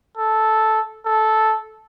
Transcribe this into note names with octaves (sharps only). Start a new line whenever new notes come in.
A4
A4